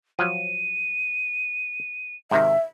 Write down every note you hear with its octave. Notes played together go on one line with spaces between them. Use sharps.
F3 F#3 D#7
G#2 C3 D#3 E5